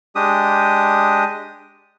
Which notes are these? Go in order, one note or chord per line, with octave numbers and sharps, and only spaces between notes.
G#3 D4 G4 D#6